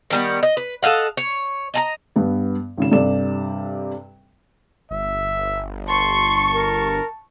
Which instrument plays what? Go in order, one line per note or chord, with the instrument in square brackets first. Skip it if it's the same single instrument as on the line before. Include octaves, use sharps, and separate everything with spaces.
[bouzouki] D#3 G3 B3
D#5
B4
A4 D#5 F5 F#5
C#5
D#5 A5 A#5
[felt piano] G2 B3
G#1 C#3 E7
G2 C3 A4 D5 E7
[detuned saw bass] G1 [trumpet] E5
[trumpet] A5 [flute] C6 [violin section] C#6
[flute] A#4